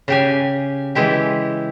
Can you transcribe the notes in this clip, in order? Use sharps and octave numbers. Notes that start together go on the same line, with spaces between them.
C#3 G4 G#5
E3 G#3 E4 G4